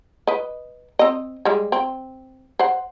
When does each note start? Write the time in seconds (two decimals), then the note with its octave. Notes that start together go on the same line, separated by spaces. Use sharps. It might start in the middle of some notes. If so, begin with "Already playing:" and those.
0.27 B4 D#5
0.99 C4 D#5
1.45 G3 G#3
1.72 C4
2.59 C5 F#5